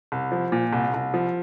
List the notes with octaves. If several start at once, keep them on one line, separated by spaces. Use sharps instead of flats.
C2
F3
A#2
C2
C2
F3